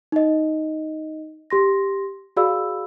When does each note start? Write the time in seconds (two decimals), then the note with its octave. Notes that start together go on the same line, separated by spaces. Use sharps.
0.12 D#4 D#5
1.50 G4 C6 A#6
2.37 F#4 G#4 D5 F5 B5 E6